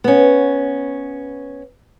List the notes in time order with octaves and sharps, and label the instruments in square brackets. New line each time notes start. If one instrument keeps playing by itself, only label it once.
[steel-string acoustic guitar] B3 C#4